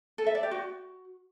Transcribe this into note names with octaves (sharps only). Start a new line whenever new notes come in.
A4
E5
D5
G4
F#4